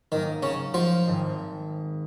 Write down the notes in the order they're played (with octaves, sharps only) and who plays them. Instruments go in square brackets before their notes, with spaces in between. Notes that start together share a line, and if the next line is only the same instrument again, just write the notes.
[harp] G#2 F#3 A#3 D#4 A#4 [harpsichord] D#3
[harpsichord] C#3 C#4
F3 F4
[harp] G#1 G#2 D#3 G#3